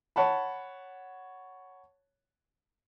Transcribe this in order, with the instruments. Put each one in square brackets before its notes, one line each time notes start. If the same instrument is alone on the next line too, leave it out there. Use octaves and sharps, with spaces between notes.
[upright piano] C#5 F#5 A5 B5